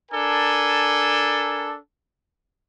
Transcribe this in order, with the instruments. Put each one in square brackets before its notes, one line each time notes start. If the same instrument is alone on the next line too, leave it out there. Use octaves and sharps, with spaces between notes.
[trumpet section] D4 A4 A#4 G#5